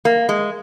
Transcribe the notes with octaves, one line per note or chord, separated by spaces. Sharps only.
A#3
G#3